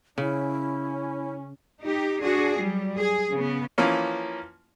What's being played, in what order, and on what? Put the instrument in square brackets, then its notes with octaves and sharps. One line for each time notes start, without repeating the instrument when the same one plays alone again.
[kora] C#3 [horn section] C#4 [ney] E4
[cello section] D#4 G4
D4 F#4 G#4
F#3 G3
G#4
C#3 B3
[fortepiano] E3 F3 A#3 C#4